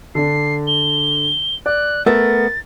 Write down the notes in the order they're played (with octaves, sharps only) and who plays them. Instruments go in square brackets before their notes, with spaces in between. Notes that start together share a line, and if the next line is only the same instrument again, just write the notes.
[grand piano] D3 D4 [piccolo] C7
[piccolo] G7
[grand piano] D5 [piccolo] F#6
[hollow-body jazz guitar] A3 B3 [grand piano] A#4 [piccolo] A6